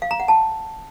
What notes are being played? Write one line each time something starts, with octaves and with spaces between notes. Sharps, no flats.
F5
A#5
F#5
A5